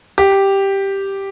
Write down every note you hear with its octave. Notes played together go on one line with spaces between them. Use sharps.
G4